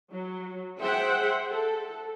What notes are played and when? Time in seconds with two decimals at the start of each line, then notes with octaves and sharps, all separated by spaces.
0.10 F#3
0.79 G#4 C5 E5 F#5 G5
1.50 A4